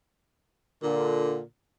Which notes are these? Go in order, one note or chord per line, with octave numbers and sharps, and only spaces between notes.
A#2 D3